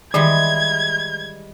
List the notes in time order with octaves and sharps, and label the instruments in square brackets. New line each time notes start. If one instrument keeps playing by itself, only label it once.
[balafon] D#3 [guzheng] E3 G3 G#3 [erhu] G#6